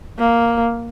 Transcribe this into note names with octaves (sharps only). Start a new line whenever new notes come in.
A#3